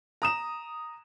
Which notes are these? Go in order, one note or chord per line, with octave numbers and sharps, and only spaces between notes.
A#5 D#6 E7